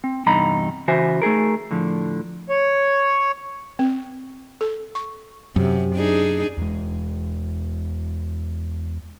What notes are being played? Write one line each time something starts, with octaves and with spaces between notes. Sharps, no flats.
C4
E2 G2 C3 D#4 A#5 B5
C#3 E3 F#4 C5 E5 G#5
A3 D#4 G#4 A#4
A2 D3 F3
C#5
C4
A4
C#6
F#2 C3
D4 D#4 G#4
E2 G#3